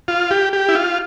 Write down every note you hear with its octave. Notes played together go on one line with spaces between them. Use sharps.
F4
G4
G4
E4
F4